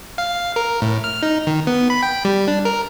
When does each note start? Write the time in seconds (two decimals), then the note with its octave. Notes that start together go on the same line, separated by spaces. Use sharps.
0.18 F5
0.56 A#4
0.82 A2
1.04 F6
1.22 D#4
1.47 D#3
1.67 B3
1.90 B5
2.03 G5
2.25 G3
2.48 D4
2.65 A#4